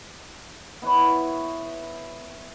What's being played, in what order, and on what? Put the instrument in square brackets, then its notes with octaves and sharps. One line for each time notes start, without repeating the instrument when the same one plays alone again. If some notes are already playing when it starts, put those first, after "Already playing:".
[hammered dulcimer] B3 E4 B4 C#5